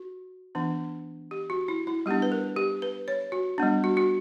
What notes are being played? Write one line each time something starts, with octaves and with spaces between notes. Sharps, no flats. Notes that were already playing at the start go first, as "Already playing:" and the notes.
Already playing: F#4
E3 B3 D4
G4
F#4
E4
E4
G3 B3 D4 G4
B4
A#4
G4
B4
C#5
F#4
G3 B3 D4
F#4
F#4